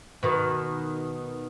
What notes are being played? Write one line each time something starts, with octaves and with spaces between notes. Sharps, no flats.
B2 D#3